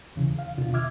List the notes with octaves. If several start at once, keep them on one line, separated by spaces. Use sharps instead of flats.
D#2 C#3 E3
F5
D#2 B2 D3 F4
E5 D6 E6 F6 G#6